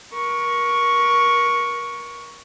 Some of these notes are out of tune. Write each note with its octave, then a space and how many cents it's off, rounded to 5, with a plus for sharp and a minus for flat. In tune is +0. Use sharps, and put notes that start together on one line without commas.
A#4 +35 C#6 +0